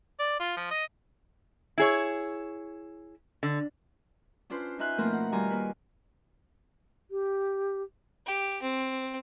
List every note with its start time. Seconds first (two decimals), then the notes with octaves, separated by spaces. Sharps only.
0.19 D5
0.40 F4
0.57 F3
0.71 D#5
1.78 E4 G#4 C#5
3.43 D3
4.50 C#4 D4 F4 B4 C5
4.79 D#4 F4 E5 G#5 F#6 G6
4.98 B2 F3 A3 A#3 C4 A#4
5.13 F#5
5.32 D#3 G3 F4 F#4 G#5 A#5
5.50 A#3 B4
7.11 G4
8.26 G4
8.62 C4